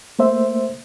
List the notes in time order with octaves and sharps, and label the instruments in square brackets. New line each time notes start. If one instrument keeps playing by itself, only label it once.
[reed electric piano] A3 A#3 C5 E5